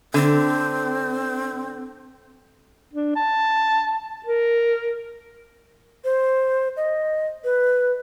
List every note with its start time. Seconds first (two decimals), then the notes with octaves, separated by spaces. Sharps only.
0.14 D3 C4
2.94 D4
3.16 A5
4.26 A#4
6.05 C5
6.77 D#5
7.44 B4